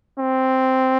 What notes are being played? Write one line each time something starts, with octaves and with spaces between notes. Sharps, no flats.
C4